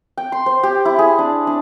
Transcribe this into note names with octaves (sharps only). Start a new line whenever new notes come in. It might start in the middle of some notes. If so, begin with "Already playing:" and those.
G5
C6
C5
G4
E4
G#4
D4
D4